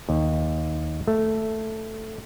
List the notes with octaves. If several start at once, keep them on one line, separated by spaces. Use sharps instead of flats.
D#2
A3